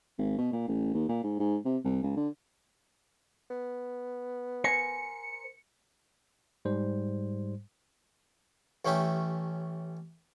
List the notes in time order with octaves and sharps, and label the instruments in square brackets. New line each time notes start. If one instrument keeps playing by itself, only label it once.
[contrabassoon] G#1
B2
A#2
A1
D#2
A#2
G#2
G#2
C3
C2
C#2
D3
[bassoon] B3
[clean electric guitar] A#4 C5 G#5 [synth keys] C#7
[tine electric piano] G#2 G3 C5
[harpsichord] A1 A3 C#4 G4 E5